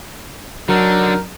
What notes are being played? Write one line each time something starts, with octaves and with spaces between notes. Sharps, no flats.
D3 F#3 D4 D#4 A#4